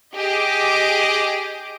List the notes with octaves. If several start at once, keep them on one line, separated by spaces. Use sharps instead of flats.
G4 G#4 D#5 D6